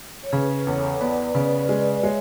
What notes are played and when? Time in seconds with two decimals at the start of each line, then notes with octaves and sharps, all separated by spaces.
0.23 C#5
0.32 C#3 G#4 B4
0.66 E2 A4 C#5
1.01 B3 B4 D5
1.35 C#3 B4 D5
1.69 G#3 B4 D5
2.02 G#3 C#5 E5